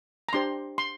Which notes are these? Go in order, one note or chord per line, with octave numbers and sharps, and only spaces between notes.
A#5
D4 G4 C5 C6
C6